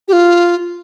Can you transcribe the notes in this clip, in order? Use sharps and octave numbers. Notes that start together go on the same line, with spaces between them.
G4
F4